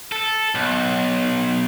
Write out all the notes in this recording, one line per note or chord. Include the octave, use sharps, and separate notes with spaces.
A4
B1